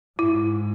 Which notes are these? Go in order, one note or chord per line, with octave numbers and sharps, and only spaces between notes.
G#2 E4